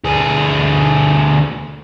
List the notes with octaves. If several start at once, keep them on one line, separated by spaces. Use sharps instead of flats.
D2 G#4